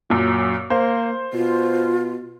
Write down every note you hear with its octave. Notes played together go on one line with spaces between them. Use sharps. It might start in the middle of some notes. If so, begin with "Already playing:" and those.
F#2 A#2 F#3
A#3 C5
B2 F4